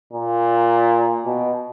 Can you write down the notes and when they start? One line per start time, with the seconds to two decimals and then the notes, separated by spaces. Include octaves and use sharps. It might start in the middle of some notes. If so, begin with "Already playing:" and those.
0.13 A#2
1.26 B2